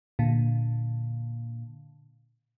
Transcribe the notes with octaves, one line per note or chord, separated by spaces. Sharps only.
A#2 D3